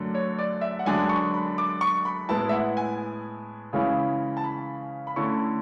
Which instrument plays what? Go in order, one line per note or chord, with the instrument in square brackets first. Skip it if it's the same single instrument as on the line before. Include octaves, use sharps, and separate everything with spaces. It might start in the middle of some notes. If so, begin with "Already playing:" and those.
Already playing: [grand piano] F#2 D3 A3 D4
C#5
D5
E5
F#5
F#2 D3 G#3 D4 G#5
C#6
B5
D6
C#6
B5
A2 G#3 B3 E4 A5
E5
F#5
G#5
C#3 E3 G#3 C#4 E4
A5
B5
B5
D3 A3 C#4 E4 C#6